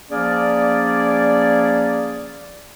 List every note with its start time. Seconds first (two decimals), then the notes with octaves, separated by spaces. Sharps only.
0.11 F3 A#3 C#4 G#4 D5